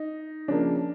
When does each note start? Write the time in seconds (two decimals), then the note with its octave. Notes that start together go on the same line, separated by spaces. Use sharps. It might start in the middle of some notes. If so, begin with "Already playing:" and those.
Already playing: D#4
0.48 C#3 F3 A#3 D4